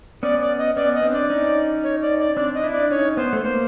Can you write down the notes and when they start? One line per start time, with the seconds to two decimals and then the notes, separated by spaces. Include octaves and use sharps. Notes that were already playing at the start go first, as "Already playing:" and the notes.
0.23 B3 C#4 D5
0.41 D5
0.58 D#5
0.76 B3 C#4 D5
0.95 D#5
1.03 C4 D4
1.13 D5
1.30 C#4 D#4
1.83 C#5
2.02 D5
2.19 D5
2.37 C4 D4 D5
2.54 D#5
2.64 D4 E4
2.73 D5
2.90 C#4 D#4 C#5
3.17 B3 C5
3.33 A3
3.44 A#3 C5